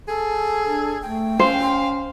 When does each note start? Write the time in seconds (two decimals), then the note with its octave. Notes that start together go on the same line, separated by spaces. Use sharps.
0.08 G#4 A4
0.64 D4
1.02 A3 G5
1.39 C#4 C5 F5